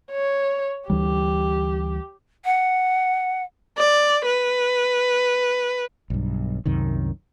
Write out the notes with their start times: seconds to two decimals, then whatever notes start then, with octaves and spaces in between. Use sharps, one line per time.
0.12 C#5
0.90 D2 E3 G3 G4
2.45 F#5
3.78 D5
4.26 B4
6.10 B1 G2
6.66 C2 F#2 C3 D#3